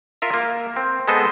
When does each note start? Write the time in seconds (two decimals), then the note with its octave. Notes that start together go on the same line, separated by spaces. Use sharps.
0.22 F4 A#4 E5
0.34 A#3
0.76 C4
1.08 G#3 B3 A4 C5 D#5